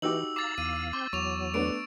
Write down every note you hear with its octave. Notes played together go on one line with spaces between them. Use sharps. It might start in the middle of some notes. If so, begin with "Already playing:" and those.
E3 D#4 F#4 G4 E6 F#7
F5 A#5 D6 A6
E2 F5 D#7
C4 C6 D6 G6
E2 F#3 C#6 F7
A3 B3 D4 D7